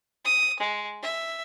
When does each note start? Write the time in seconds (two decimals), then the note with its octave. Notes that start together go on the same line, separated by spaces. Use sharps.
0.25 D#6
0.60 G#3
1.02 E5